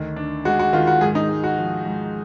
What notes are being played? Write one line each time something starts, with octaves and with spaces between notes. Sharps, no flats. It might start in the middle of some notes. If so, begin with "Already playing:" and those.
Already playing: D2 D3 D#3
D4
G#3 F#4
F#4
D#3 F4
F#4
G#2 G#4
D#4
G#3
F#4
F3
G#2